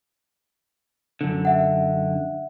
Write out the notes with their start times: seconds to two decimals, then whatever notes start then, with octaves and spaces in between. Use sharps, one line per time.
1.21 F#2 D3
1.45 E5 F#5